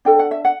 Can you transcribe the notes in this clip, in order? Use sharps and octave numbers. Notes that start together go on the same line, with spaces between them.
D4 A4 G5
F#5
E5
F#5